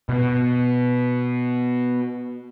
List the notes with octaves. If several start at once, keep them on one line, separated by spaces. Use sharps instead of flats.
B2 B3